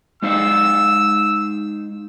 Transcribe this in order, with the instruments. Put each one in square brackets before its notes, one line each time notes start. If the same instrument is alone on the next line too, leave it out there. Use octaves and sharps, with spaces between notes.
[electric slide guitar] G#3 D#4 F5 [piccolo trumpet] E6